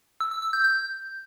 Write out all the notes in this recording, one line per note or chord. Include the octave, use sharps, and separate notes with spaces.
E6
E6
E6
G6
G6